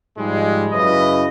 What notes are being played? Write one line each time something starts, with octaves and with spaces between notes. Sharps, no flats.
G#2 F3 G3 G#3
F#2 C#3 E4 B4 D#5